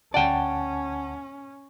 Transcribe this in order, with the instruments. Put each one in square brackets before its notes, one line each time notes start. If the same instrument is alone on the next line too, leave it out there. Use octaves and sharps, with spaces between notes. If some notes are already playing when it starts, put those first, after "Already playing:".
[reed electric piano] D2 F#5 A5 [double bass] C#4 [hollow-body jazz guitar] D5 G5